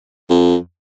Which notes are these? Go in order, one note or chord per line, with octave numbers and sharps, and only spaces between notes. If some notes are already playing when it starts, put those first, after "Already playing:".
F2